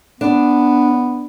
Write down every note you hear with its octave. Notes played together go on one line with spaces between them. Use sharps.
B3 D4